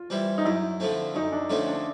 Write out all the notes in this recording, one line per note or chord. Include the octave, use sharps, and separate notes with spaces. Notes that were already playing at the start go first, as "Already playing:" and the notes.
Already playing: F4
E3 G3 C4
D#4
F#2 E4
D3 F3 A3 C4
F#2 D#4
D4
D3 F3 A3 C4 C#4
D4